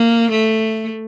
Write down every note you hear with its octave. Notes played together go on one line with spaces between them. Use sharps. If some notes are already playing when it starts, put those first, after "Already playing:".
Already playing: A#3
A3